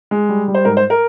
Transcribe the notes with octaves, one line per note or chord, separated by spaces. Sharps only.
G#3
G3
G3
C5
G#2 A#4
C5
A#4